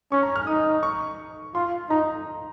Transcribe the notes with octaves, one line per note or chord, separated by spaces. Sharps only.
C#4 C#6
A#5
F6
D#4 D#6
C#6
F4 C6
D#4 A#5